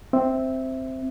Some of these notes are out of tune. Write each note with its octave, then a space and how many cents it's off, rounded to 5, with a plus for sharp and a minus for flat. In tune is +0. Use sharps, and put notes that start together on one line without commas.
C4 +0 E5 +0